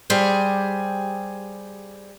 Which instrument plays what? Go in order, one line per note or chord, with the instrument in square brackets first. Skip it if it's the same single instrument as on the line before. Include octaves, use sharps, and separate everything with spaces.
[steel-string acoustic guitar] G3 G4 G#4 C5